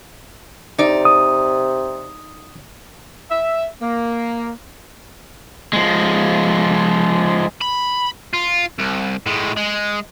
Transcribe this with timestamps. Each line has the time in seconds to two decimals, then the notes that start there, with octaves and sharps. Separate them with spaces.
0.79 C3 D#4 D5
1.05 D#6
3.30 E5
3.82 A#3
5.73 F3 G#3
7.62 B5
8.33 F4
8.78 C2
9.26 A2 G#3
9.57 G#3